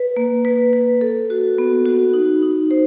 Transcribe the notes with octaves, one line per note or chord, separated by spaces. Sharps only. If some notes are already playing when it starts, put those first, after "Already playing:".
Already playing: B4
A#3
B4
B4
A4
F#4
B3
F#4
D#4
D#4
C5